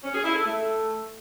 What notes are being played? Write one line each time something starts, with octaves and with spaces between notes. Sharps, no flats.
C#4
G#4
E4
A4
A3